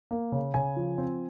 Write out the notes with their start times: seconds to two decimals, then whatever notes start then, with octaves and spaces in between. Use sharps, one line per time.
0.11 A#3
0.32 C#3
0.54 C#3 G#5
0.76 F3
0.98 C4